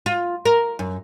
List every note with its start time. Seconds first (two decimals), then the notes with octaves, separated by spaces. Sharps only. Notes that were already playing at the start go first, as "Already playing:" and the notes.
0.06 F4
0.45 A#4
0.79 F#2